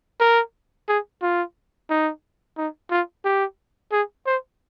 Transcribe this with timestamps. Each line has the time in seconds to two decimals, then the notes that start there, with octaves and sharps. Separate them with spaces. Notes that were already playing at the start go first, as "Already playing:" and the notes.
0.20 A#4
0.88 G#4
1.22 F4
1.90 D#4
2.57 D#4
2.91 F4
3.24 G4
3.92 G#4
4.26 C5